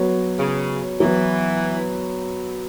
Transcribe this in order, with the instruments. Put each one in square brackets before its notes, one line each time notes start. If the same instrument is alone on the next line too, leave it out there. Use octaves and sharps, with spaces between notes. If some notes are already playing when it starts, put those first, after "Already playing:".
Already playing: [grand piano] F#3 B3 F#4 C#5
[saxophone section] C#3
[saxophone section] E3 [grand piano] F#3 B3 F#4